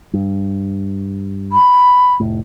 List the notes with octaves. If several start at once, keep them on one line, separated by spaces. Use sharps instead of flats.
G2
B5
F1 A2